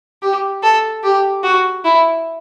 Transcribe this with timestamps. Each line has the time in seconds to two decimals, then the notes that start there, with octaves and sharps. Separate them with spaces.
0.22 G4
0.63 A4
1.03 G4
1.43 F#4
1.84 E4